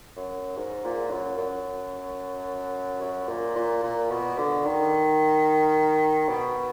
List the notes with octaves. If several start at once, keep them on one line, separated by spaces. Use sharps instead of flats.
F#2
G#2
A#2
F#2
F#2
F#2
A#2
A#2
A#2
B2
D3
D#3
B2